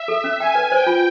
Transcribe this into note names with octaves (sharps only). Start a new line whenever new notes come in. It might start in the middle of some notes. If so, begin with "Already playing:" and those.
Already playing: E5
A4
C#4
G5 G#5
B4
C5 G5
F4